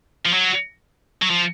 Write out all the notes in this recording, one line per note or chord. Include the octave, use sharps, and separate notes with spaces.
F3
F#3
F#3
F3